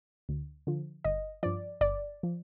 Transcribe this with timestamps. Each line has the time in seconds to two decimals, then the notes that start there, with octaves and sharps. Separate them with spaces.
0.29 D2
0.67 D3 F3
1.04 G1 D#5
1.43 G2 F3 D5
1.81 G1 D5
2.23 F3